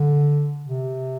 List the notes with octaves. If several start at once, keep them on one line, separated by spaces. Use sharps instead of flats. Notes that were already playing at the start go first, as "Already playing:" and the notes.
Already playing: D3
C3